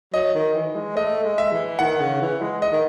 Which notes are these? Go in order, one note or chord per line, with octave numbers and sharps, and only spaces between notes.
F#3 D#5
D#3
E3
G#3
A3 D#5
G#3
E5
E3
D#3 F#5
C#3
E3
G#3
D#5
D#3